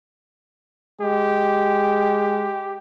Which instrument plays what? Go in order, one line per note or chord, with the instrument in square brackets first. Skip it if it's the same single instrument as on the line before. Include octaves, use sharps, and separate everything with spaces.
[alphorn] G#3 [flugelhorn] G4